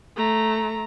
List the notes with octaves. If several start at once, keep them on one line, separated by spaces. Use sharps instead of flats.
A3 A#5